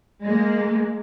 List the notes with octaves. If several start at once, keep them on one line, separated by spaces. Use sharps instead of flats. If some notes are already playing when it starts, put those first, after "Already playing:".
G#3 A#3